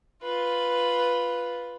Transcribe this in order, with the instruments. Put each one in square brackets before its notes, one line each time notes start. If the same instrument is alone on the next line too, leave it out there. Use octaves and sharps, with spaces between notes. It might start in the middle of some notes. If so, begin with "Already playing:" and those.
[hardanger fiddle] F4 B4